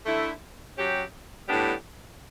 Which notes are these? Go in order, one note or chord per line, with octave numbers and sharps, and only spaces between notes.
D3 A3 E4
F#3 C#4 G4
A2 G3 B3 D4 G4